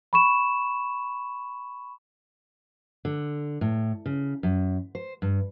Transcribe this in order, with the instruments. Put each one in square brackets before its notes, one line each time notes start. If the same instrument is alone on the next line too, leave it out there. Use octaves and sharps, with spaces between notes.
[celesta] B5 C#6 E7
[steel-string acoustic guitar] D3
A2
C#3
F#2
C5
G2